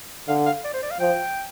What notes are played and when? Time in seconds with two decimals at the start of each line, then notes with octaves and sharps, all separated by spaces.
0.28 D3 F5
0.46 F5
0.64 D5
0.74 C5
0.83 D5
0.91 F5
1.00 F3 G5